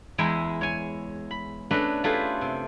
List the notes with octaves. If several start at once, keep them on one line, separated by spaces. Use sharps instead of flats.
E2 G#3 E4 G5 G#5 A#5
C#5 G#5
B5
A3 C#4 D4 G#4 B4 D#5
A3 E4 F4 G4 G#4 B4
C3